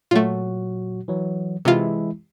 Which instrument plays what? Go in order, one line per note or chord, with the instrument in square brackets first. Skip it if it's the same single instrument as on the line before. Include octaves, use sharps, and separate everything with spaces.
[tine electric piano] A#2 F#3 F#4 [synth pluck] A3 F4
[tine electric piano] E3 F#3
[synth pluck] C3 F4 [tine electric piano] E3 G#3 E4